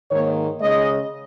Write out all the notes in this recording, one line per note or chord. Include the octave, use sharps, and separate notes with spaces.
G#2 D#3 A#3 C#5
C#3 G#3 D#5